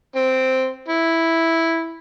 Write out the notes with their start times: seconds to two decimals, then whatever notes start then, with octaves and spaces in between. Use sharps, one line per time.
0.16 C4
0.88 E4